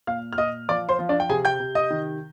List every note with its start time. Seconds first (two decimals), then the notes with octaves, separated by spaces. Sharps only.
0.07 A#2 F5 F6
0.33 F6
0.38 A#2 D#5 D#6
0.68 F3 D5 D6
0.89 C5 C6
0.99 F3
1.09 D4 D5
1.20 G5
1.29 C3 G#4 G#5
1.45 G5 G6
1.60 C3
1.75 D#5 D#6
1.90 D#3